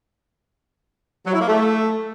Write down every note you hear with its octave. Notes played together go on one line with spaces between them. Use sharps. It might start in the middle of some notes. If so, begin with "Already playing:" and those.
F#3
E4
A#3
A3